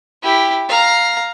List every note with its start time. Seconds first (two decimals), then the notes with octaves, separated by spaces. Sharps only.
0.23 E4 G4
0.69 F5 A#5